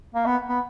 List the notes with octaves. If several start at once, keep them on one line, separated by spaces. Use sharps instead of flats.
A#3
B3
B3